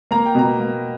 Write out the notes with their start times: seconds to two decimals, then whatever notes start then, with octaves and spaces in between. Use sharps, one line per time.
0.11 A#3 A#5
0.25 G5
0.35 B2 A#5
0.60 A#3